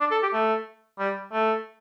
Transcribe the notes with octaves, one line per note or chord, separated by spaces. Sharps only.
D4
A4
G4
A3
G3
A3